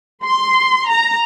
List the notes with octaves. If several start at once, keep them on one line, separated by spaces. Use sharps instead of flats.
C6
A#5